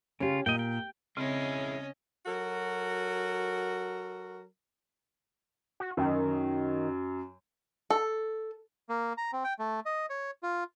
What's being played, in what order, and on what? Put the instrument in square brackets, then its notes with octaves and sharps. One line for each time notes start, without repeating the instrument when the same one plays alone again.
[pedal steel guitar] C#3 F4 [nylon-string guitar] C#4 G4
[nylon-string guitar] A#2 [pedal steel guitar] D#5 G5
[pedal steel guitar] G5
[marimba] C#3 C4 [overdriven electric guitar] G#3 E4 [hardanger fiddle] C#4 D#5
[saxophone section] F#3 F#4 A4 A#4
[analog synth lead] F#4
[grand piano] F#2 F#3 [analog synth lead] D#3
[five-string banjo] A4
[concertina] A#3
A#5
C4
G5
A3
D#5
C#5
F4